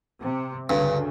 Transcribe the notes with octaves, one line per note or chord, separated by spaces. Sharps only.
C3
D2 G2 C#3